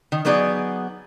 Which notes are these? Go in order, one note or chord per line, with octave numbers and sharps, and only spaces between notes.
D#3
F#3 B3 D#4 G#4 D5